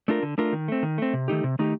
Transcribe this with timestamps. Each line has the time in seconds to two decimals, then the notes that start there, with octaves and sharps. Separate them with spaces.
0.08 A3 D4 F4 A#4
0.23 D3
0.38 A3 D4 F4 A#4
0.53 D#3
0.68 A3 C4
0.83 D#3
0.98 A3 C4
1.13 C3
1.28 D#3 A3 D#4 G4
1.44 C3
1.59 D#3 A3 D#4 G4